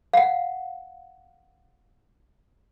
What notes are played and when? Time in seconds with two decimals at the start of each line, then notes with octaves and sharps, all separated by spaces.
0.13 F5 F#5